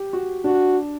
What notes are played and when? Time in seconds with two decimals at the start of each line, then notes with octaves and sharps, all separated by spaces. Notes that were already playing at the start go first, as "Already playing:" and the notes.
Already playing: G4
0.13 F#4
0.44 D4 F#4